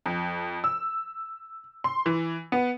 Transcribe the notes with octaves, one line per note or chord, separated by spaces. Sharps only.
F2
E6
C6
E3
B3